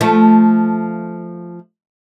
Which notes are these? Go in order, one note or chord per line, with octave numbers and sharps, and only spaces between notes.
F3 A3